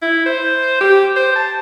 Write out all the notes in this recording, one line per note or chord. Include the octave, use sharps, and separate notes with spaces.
E4
C5
G4
C5
A5